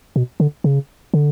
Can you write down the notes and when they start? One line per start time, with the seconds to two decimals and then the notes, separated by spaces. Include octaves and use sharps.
0.16 B2
0.40 D3
0.64 C#3
1.14 D3